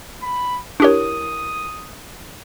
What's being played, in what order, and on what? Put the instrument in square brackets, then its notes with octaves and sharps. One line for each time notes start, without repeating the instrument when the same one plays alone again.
[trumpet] B5
[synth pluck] D4 G4 C#5 [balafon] E4 A#4 [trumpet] D#6